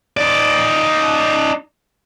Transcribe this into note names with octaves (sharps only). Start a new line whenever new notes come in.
D#4 D5